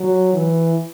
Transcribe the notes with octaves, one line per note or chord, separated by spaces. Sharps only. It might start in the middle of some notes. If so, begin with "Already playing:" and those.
Already playing: F#3
E3